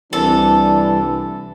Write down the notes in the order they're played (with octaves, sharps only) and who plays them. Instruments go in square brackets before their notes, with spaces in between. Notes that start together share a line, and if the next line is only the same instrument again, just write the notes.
[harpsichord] C2 [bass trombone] E3 [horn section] G3 D4 [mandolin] A4